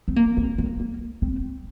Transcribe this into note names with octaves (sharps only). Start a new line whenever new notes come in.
C4
A#3
C4
A#3
A#3
C4